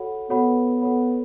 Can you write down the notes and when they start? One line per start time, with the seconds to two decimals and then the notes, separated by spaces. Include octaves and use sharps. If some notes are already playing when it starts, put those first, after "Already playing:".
Already playing: F#4 A4 C#5 F#5 B5
0.30 B3 F#4 A4 C#5 F#5 B5
0.82 F#4 A4 C#5 F#5 B5